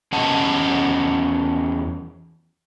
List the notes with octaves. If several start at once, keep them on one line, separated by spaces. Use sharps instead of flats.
E2 C#4 D#5 F#5 A5